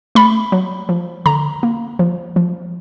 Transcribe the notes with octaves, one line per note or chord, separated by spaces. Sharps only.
A3 B5
F#3
F3
D3 A#5
A#3
F3
F3